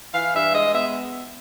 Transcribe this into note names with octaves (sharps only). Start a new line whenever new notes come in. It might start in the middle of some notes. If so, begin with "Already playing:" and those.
E3 F5
G2 E5
G#3 D#5
B3 E5